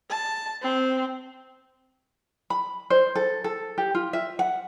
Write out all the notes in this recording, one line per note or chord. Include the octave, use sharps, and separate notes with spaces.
A5
C4
B5
C5
A4
A4
G4
F4
E5
F#5